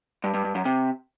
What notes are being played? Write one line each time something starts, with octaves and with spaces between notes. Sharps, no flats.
G2
G2
G2
F#2
C3